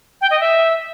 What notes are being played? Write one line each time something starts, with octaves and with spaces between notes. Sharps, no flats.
G5
D#5
E5